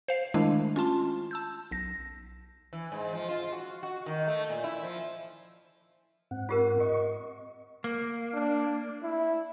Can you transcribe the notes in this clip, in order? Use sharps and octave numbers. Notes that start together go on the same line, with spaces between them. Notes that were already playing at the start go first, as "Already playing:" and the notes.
C5 F5 C7
D#3 G#3 A3 D4 E4
C#4 F4 A5 C6
A5 E6 G6
B1 A#6
E3
G#2
F3
F4
F#4
F#4
D#3
A3
A#2
E4
F3
G#2 C4 F#5
F4 G4 A#4
D#5 C#6
A#3
D4
E4